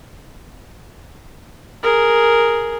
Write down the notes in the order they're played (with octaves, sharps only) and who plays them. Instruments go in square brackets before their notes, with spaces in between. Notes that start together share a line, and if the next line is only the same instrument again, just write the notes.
[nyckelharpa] G#4 A#4